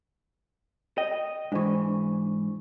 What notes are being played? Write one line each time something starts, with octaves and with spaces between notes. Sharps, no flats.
D#5 G5
G#2 E3 D4 C5 C#6